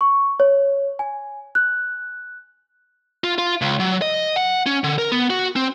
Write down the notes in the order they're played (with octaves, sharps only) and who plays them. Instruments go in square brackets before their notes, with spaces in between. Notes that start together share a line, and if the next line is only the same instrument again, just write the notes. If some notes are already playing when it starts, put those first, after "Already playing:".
[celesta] C#6
C#5
G#5
F#6
[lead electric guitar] F4
F4
C#2
F#3
D#5
F#5
C#4
D3
A#4
B3
F#4
C4